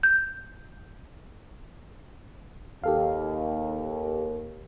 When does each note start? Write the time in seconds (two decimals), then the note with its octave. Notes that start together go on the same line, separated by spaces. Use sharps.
0.03 G6
2.84 D#2 G4 A4 F5